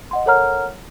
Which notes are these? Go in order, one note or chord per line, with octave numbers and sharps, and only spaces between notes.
D#5 F#5 C6
A4 A#4 C#5 F#5 A#5 F6